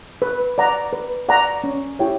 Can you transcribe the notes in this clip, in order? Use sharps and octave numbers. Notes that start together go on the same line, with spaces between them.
B4
D5 F#5 A#5
B4
D5 F#5 A#5
C#4
E4 G4 C#5 G5